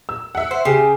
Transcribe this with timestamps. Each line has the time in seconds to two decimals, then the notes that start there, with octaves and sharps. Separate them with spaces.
0.09 E6
0.35 E5 F#5
0.51 C5
0.65 C#3 G4